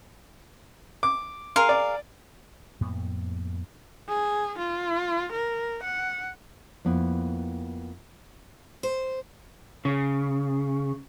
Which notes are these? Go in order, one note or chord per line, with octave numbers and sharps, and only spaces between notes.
D6
G#4 A#4 F5 C6
D5
F2 A2 A#3 B3
G#4
F4
A#4
F#5
F2 A#3 B3 E4
C5
C#3